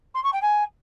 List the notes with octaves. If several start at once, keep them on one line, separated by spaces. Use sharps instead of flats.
C6
C#6
G5
G#5